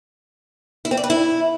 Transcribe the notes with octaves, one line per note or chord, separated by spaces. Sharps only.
E4
C4
D5
B4
E4